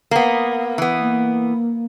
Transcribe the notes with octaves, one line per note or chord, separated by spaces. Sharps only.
A#3 B3
E3 B3
A#3